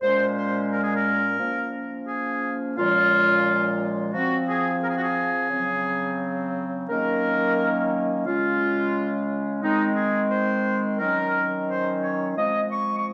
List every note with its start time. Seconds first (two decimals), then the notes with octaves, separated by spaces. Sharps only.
0.02 A#2 G#3 C#4 C5
0.36 C5
0.71 A#4
0.84 G#4
0.95 A#4
1.39 F3 A#3 C#4
2.08 G#4
2.76 A#2 F3 G#3 C#4 F4
4.13 F3 C4 F#4
4.48 G#4
4.82 A#4
4.89 G#4
4.97 F#4
5.03 G#4
5.50 C#3 F#3 C4
6.88 D#3 F#3 A#3 C#4 A#4
8.25 C#3 G#3 C#4 F4
9.62 D#3 G#3 C4 D#4
9.96 G#4
10.31 C5
10.99 D#3 F#3 C#4 A#4
11.68 C5
12.02 C#5
12.37 F3 G#3 C4 D#5
12.71 C#6
12.98 C#6